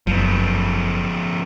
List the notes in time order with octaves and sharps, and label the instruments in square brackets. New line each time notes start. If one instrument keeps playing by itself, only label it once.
[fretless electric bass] F#1 [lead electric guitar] F3 B3